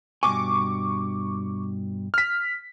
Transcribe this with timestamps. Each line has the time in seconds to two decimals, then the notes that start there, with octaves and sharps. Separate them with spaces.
0.23 G2 B2 G#5 C#6 D6
2.14 F6 B6